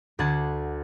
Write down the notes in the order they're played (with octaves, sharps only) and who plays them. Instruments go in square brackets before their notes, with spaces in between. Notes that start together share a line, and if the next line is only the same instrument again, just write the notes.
[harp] D2 D3 F#5 A5 G#6